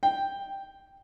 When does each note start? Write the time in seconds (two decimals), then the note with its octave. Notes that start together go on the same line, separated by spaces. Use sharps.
0.03 G5